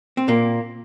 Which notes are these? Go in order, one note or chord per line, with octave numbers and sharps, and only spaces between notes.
C4
A#2 A#3